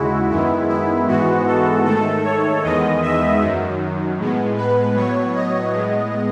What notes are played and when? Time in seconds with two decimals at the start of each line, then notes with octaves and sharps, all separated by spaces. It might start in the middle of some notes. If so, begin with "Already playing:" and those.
Already playing: D#2 C#3 G#3 E4 F#4
0.30 F#2 D#3 G#3 B3 E4
0.69 E4
1.08 G#2 E3 G#3 B3 F#4
1.47 A4
1.86 G#2 D#3 A3 A4
2.24 C#5
2.63 E2 D#3 G#3 B3 D#5
3.02 E5
3.41 F#2 D#3 F#3
4.18 A2 G#3 B3
4.57 B4
4.96 A2 F#3 B3 C#5
5.35 D#5
5.73 A2 G#3 B3